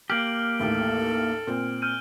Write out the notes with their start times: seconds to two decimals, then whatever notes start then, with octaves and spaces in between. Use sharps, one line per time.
0.10 A#3 G4 F6 D7 F#7
0.60 A1 D#2 A2 A4
1.47 A#2 C4
1.82 F6 G6 D#7